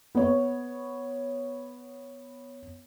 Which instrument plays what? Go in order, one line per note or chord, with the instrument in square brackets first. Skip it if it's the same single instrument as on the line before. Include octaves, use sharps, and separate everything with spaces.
[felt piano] B3 C#5